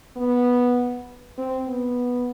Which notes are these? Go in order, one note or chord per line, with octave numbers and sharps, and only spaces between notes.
B3
C4
B3